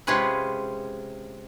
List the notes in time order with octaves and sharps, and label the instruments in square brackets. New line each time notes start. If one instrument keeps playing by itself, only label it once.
[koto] C3 G#3 C#4 F4 G#4 B4